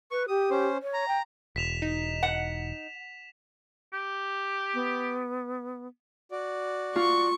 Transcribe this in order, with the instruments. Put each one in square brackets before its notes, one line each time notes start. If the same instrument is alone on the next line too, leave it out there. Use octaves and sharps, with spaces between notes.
[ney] B4 [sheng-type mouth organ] C#6
[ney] G4 [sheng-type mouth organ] D#6
[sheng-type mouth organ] C#4 C5
[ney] C#5
[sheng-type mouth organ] A#5
[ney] G5
[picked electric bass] E1 [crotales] B6 E7 F7
[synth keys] D#4
[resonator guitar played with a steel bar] F#5
[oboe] G4
[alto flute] B3
[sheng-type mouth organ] F#4 D5
[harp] F4 [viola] C#6